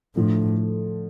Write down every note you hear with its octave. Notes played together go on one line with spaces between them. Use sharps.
A2 D3 F3 A3